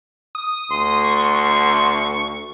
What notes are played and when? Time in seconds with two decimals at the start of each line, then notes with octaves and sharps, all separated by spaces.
0.35 D#6
0.71 D2 C6
1.04 C#6